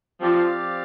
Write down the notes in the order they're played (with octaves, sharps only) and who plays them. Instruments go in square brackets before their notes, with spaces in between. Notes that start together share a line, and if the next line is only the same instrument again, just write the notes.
[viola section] F3 [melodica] C4 G4 D5 F5